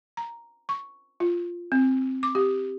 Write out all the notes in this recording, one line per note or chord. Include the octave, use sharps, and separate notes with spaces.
A#5
C#6
F4
C4
D6
G4